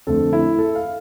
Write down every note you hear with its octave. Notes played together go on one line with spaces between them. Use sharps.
F2 D3 A3 A4
E4
A4
F5